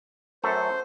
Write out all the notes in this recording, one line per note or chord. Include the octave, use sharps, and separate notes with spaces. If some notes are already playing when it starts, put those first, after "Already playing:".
F#2 A3 A4 C5